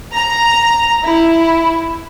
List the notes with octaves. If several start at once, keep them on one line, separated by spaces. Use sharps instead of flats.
A#5
E4